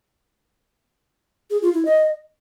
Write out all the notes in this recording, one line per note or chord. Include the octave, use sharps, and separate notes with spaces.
G#4
F4
E4
D#5